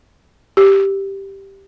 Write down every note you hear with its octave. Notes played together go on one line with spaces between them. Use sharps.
G4